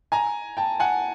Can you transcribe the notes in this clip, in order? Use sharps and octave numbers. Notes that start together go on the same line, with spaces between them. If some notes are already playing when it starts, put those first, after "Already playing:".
G#5 A#5
G5 A5
F#5 G#5